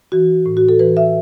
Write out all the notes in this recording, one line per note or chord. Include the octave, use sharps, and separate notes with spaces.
E3 F#4
A2
F#4
A4
E3 B4
E5